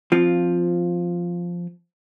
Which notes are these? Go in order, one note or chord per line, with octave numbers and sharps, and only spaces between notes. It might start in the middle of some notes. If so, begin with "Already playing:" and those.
F3 C4 F4